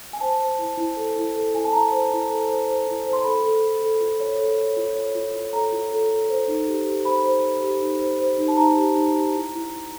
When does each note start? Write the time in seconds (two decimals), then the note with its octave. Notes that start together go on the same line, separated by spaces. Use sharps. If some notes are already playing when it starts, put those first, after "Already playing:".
0.13 G#5
0.20 C5 A5
0.40 C5
0.59 E4
0.77 E4
0.96 A4
1.16 E4
1.34 A4
1.54 E4 G#5
1.64 A5
1.72 E4 A#5
1.92 C5
2.11 E4
2.30 A4
2.49 C5
2.68 C5
2.87 E4
3.06 C5
3.13 C6
3.24 A4 B5
3.44 A4
3.63 A4
3.82 A4
4.01 F4
4.20 C#5
4.39 A4
4.58 C#5
4.77 F4
4.96 C#5
5.15 F4
5.34 F4
5.53 A4 A#5
5.72 F4
5.91 A4
6.10 A4
6.29 C5
6.48 D#4
6.67 G4
6.86 G4
7.05 C5 B5
7.24 C5
7.43 C5
7.62 G4
7.81 D#4
8.00 C5
8.19 C5
8.38 D#4
8.48 A5
8.57 D#4 A#5
8.77 G4
8.95 D#4
9.14 G4
9.34 E4
9.53 E4
9.71 E4